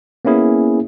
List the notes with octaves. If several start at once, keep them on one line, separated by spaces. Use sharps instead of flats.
A#3 B3 C#4 E4 G#4